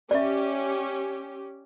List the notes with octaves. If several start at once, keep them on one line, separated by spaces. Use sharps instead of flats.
C#4 G4 D5 E5